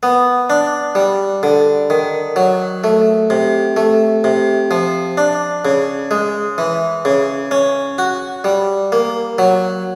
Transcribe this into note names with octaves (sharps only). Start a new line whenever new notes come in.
B3
D4
G3
D3
D#3
F#3
A3
C3
A3
C3
F3
D4
C#3
G#3
E3
C#3
C#4
F#4
G3
A#3
F#3